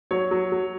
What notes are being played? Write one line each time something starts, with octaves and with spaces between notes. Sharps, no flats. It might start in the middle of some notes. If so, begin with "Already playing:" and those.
F#3 C#5
F#3
F#3